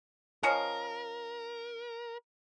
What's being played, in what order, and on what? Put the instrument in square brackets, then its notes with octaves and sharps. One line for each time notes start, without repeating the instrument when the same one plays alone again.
[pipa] F3 C#4 D#5 [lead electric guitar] A#4